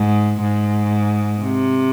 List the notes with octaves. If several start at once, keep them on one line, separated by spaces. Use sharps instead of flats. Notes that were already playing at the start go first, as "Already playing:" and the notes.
Already playing: G#2
G#2
C3